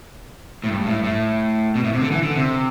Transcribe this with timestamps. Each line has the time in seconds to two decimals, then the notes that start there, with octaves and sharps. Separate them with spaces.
0.64 A2
0.69 G2
0.86 A2
1.04 A2
1.75 B2
1.84 A2
1.93 C3
2.02 D3
2.12 E3
2.23 D3
2.35 C3